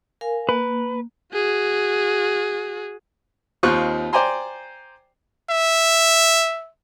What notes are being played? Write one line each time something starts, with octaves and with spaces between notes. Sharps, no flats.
A#4 F5 G#5
A#3 B4
F#4 G#4
D#2 C4 D#4 F4 C#6 F#6
C5 D5 G5 G#5 A#5 C6
E5